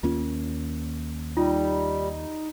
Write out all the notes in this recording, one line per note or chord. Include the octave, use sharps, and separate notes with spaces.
D#2 A#3 C#4 F4
G3 D#4 F4